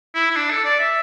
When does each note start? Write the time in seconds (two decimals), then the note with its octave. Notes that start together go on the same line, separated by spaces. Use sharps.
0.15 E4
0.31 E4
0.36 D4
0.51 A4
0.65 D5
0.79 E5